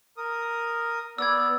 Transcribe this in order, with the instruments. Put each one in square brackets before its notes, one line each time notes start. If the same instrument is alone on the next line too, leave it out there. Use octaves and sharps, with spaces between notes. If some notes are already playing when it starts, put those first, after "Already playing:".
[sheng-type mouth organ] A#4 D#6
[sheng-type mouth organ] B3 D5 [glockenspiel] E6 G#6